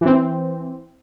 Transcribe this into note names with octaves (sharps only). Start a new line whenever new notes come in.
E3 C4